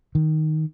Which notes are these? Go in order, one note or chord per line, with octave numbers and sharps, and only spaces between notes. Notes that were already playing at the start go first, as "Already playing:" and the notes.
D#3